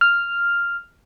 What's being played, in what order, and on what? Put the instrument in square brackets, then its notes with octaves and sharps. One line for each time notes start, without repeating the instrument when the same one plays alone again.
[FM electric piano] F6